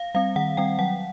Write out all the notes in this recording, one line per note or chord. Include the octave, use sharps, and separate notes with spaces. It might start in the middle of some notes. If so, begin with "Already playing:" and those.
Already playing: F5
G3 C4 F5
D#3 F#5
G3 C4 G5
F#3 F#5